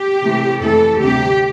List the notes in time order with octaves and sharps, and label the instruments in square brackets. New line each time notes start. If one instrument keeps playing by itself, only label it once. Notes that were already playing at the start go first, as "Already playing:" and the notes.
Already playing: [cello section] G4
C3 E3 A3 C4
F2 E3 A3 A4
D2 C3 G3 C4 G4